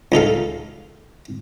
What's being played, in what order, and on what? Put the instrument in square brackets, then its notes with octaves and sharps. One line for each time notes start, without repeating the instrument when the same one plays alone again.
[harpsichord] C#2 D#4 A4 F5